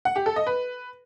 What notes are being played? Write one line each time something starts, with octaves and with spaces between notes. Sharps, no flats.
F#5
G4
A4
D#5
B4